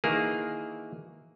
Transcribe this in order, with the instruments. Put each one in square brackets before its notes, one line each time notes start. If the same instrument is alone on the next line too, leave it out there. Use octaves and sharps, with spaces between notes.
[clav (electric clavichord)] D#3 E3 A#3 G#4